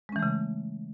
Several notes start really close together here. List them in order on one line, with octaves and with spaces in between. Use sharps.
G#3 C#4 E3 A3 C#3